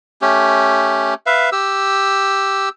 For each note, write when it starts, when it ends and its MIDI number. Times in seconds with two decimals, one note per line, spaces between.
0.22 1.14 57
0.22 1.14 61
0.22 1.14 67
1.26 1.50 71
1.26 1.50 76
1.26 1.50 77
1.52 2.69 67
1.52 2.69 88